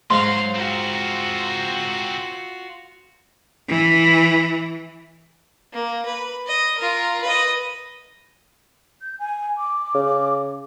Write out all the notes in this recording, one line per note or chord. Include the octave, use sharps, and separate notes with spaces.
G#2 F#3 F5 C6
C4 F4 F#4 A#4
E3
A#3
B4
D#5
F4 A#4
B4 D#5
G6
G#5
D6
C#3